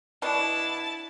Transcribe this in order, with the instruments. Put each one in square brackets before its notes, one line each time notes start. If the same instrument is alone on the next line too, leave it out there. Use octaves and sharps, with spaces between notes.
[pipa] B2 D4 [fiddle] E4 A5